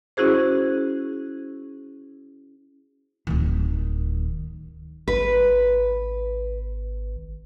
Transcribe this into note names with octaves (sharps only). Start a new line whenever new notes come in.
C#4 E4 F#4 G#4 C5
D1 D#3
G#1 B4